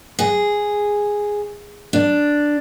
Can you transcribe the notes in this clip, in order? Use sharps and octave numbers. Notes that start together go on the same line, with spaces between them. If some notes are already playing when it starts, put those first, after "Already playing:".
G#4
D4